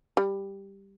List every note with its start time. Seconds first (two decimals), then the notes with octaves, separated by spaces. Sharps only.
0.17 G3